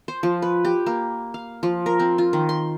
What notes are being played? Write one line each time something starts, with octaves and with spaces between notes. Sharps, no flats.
C5
F3
B4
G4
A#3
F5
F3
A#4
C4
F4
D#3
C6